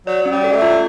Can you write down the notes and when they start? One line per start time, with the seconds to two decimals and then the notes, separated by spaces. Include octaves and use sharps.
0.07 F#3 D5
0.23 F#3 C#4
0.31 G3
0.44 A4
0.52 G#3
0.56 A3
0.62 F4